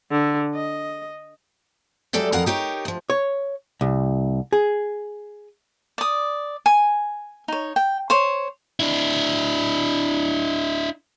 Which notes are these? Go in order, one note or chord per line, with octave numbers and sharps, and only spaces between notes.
D3
D#5
F#3 G#3 G4 A4 D5 E5
F2 E3 A#4 F5 F#5
D#4 G4 A#4 C#5
D2 F3
C#5
C2
G#4
D5 D#6
G#5
D#4 C#5
G5
C5 C#5
D4 E4